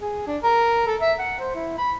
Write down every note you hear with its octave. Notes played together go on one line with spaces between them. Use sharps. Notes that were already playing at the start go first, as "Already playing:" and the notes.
G#4
D4
A#4
A4
E5
F#5
C5
E4
B5